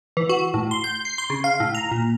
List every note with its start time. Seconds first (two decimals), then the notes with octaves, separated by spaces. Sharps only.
0.17 E3
0.29 F#4
0.54 A2
0.71 C6
0.84 G6
1.05 C7
1.18 C6
1.30 C#3
1.44 F5
1.60 A2
1.75 A#5
1.91 A#2